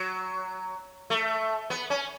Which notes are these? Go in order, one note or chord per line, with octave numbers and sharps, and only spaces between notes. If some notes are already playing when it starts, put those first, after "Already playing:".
Already playing: F#3
A3
B3
C#4